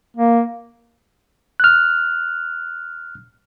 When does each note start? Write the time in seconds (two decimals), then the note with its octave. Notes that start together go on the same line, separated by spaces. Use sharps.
0.17 A#3
1.60 F6 F#6